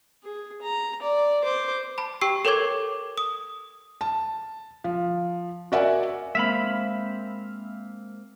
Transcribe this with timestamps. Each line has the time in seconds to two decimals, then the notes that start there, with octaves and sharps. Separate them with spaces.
0.24 G#4
0.62 A#5
1.02 D5
1.43 C5 D6
1.98 A5 B5
2.21 G4 G5 C#6 E6 C7
2.45 A4 A#4 C#5 C#6 D6 G#6
3.18 D#6
4.01 A5
4.84 F3
5.72 F#4 A#4 D5 E5 F#5 G#5
6.35 G#3 A#3 C4 E5 F5 B5